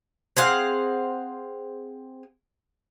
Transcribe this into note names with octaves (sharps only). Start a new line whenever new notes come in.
C4 G#4 F5 F#5